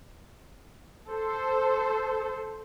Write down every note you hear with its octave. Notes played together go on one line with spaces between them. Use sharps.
A4 C5